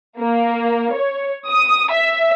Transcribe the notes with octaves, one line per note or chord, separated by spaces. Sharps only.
A#3
C#5
D#6
E5